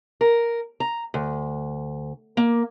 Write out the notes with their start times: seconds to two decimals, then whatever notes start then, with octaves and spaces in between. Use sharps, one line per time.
0.21 A#4
0.80 A#5
1.14 D2
2.37 A#3